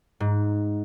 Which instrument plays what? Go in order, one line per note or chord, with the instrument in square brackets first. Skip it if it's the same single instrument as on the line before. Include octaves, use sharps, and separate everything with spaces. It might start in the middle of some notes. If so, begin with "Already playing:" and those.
[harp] G#2